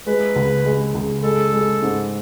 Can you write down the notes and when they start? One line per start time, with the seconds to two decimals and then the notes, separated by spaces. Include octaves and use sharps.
0.07 G#3 B4
0.36 C#2
0.65 G#3
0.95 C#2
1.23 G#3 A4
1.53 G#3
1.82 G#2